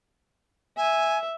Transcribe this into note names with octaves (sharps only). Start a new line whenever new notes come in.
E5 G#5